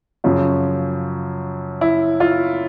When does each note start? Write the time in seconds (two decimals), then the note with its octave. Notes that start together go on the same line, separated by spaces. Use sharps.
0.24 F#2 C#3 F3 F4
1.81 E4
2.20 F4